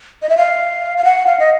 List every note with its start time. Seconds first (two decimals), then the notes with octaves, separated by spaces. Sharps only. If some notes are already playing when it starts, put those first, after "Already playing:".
0.22 D#5
0.29 E5
0.37 F5
0.98 F5
1.04 F#5
1.27 F5
1.40 D#5